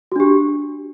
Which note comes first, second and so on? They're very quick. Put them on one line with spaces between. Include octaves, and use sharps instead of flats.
F#4 D4 G4